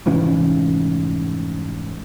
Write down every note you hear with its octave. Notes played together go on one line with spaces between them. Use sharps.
F1 G#2 E3 C#4